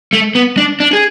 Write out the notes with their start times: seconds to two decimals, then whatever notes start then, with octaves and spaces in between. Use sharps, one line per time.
0.13 A3
0.35 B3
0.57 D4
0.80 D4
0.93 G#4